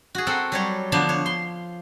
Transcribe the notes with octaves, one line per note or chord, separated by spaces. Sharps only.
F#4 G#4
C4 A4 A#4 F#5
F#3 G3 C#5
D3 F3 B3 D4
C#5
C6